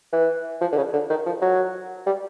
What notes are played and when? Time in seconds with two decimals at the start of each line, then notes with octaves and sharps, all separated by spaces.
0.13 E3
0.61 F3
0.73 D3
0.77 C#3
0.93 D3
1.10 D#3
1.26 F3
1.42 F#3
2.06 G3